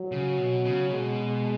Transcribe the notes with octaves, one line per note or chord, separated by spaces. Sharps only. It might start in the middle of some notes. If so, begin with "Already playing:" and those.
Already playing: F#3
C#3
B2
C#3
B2 G#3